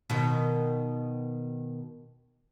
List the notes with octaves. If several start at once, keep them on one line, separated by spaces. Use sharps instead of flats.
B2 D#3